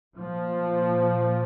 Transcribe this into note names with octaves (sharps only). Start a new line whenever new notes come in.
A#2 F3